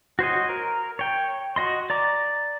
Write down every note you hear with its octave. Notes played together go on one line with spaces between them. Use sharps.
F#4 C5 C#5 D#5
A#4
C#5 G5
F#4 D#5 C6
D5 A#5 D6